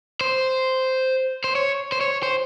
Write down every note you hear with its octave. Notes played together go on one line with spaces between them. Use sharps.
C5
C5
C#5
C5
C#5
C5